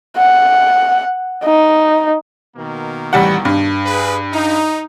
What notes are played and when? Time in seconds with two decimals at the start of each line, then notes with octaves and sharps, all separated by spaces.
0.17 F#5
1.44 D#4
2.56 B2 D#3 A#3
3.13 A1 G3 F#5
3.45 G2
3.85 G#4 B4
4.32 D#4